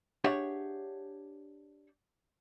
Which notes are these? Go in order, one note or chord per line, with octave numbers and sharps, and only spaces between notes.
D4 G4 G#4 C#5 E5 F#5